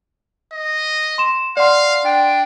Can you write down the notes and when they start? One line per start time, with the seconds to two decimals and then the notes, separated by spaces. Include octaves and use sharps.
0.53 D#5
1.18 C6 E7
1.57 D5 F5 F#5 C6
2.05 D4 G5